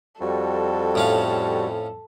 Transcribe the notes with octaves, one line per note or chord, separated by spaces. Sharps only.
F2 G3 F#4 A4
A2 C#4 F5